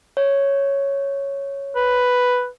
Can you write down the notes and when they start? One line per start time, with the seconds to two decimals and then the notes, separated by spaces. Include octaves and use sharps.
0.17 C#5
1.76 B4